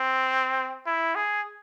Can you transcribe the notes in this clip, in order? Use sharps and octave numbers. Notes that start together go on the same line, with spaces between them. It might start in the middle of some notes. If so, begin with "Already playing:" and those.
Already playing: C4
E4
G#4